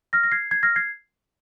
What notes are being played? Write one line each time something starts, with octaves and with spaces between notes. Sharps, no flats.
F6 A#6
A#6
G#6 C7
G#6 C7
F6 A#6
G#6 C7